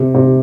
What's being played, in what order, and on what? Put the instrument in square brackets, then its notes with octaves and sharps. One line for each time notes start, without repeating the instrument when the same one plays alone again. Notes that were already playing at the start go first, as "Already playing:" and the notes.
Already playing: [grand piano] C3
C3